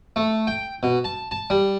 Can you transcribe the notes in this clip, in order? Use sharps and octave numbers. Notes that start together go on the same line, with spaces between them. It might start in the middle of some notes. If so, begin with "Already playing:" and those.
A3
G5
B2
A5
A5
G3